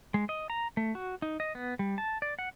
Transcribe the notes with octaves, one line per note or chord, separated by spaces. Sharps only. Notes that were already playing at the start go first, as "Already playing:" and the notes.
G#3
D#5
A#5
A3
F#4
D#4
D#5
B3
G3
A5
D5
F#5